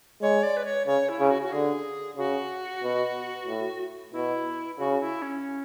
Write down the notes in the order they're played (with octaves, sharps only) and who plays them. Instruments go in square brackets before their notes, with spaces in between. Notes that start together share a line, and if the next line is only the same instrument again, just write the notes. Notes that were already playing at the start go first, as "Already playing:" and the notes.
[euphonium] G#3 [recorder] C#5
[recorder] D5
B4
C#5
[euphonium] C#3 [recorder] C#5
[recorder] E4
[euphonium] C#3
[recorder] F#4
F#4
[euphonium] D3 [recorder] G#4
[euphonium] C#3 [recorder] F#4
[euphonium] B2
A2
[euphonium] B2 [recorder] E4
[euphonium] C#3 [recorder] F#4
[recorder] E4
C#4